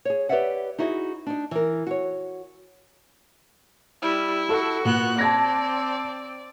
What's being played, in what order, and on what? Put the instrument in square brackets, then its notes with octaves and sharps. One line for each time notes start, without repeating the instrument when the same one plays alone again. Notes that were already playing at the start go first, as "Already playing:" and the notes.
[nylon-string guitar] G#4 C#5
G4 B4 C#5 D5 E5 F#5
D#4 E4 F#4 G#4 D#5
D4 D#4
E3 A#4
F#4 C#5
[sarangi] G3 [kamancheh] E4
[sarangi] F#4 [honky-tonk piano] A4
[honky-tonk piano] A#2 [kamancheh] B3 F#6
[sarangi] C4 [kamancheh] D5 [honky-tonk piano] A5 G#6 A#6